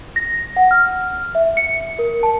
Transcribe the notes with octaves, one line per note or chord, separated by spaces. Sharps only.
A#6
F#5
F6
E5
C#7
A#4
A5